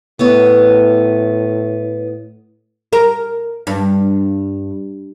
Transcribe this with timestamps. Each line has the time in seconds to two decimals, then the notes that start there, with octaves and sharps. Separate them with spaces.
0.19 A2 B3 E4 C#5
2.93 A#4
3.67 G2